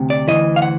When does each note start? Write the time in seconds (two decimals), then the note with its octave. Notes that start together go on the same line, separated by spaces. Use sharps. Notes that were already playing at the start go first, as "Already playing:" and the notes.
Already playing: D2 C3
0.10 D5
0.28 D2 C3 E3 D#5
0.56 F5
0.62 F#5